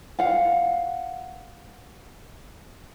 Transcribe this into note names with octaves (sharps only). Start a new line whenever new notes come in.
F5 F#5